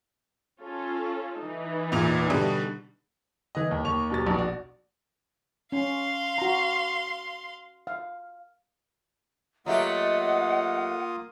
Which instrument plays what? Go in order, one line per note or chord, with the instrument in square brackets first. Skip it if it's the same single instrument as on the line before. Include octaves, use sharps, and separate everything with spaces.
[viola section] C#4 F4 A4
E3 D#4
[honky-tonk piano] E2 A#2 F7
B2 D3 G3
[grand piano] E3 B4 D#5
D#2 A#3
D#2 A#3 C#6 F7
D#2 B2 F#3 G3 A6
A#1 B2
F#4 D5
[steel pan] C#4 [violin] F5 C6
[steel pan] F#4 A#5
F5
[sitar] F#3 A3 G4 [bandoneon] A#3 F4 D#6 [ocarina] D#5 [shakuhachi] F#5